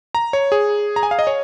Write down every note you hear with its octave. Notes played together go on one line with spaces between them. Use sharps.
A#5
C#5
G#4
A#5
G#5
F5
D#5
C#5